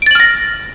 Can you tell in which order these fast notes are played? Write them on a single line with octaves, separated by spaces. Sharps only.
D7 A6 F#7 F6 A#6